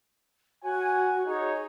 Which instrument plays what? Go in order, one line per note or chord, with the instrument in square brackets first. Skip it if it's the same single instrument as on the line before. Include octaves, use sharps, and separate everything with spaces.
[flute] F#4 [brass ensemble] C#5 F#5 G#5
[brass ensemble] D#4 C#5 [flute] G#4